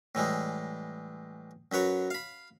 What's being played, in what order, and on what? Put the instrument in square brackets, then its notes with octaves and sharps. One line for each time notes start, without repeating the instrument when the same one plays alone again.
[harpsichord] A2 E3 G3 G#3
F#2 F#3 B4 C#5
F5 B5